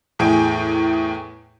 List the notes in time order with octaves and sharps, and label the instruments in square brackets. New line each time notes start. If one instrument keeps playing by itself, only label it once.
[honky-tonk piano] E2 A2 G#4 G5 G#5 D7